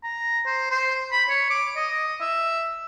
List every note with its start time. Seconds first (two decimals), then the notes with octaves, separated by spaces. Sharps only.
0.04 A#5
0.46 C5
0.70 C5
1.12 B5
1.29 C#5
1.50 D6
1.76 D#5
2.21 E5